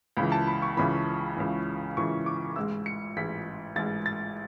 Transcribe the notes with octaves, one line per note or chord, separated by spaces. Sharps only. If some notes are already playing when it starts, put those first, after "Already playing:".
C#2 C#3 E3 B5
A5
B5
C#6
C#2 C#3 E3 B5
C#2 C#3 E3
C#2 C#3 E3 C#6
D6
A1 G#2 G#3 E6
C#7
A1 G#2 G#3 B6
A1 G#2 G#3 A6
A6